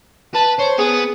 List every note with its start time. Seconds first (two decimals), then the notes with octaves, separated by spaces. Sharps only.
0.35 B4 A5
0.59 C5 C#5
0.79 B3 G#4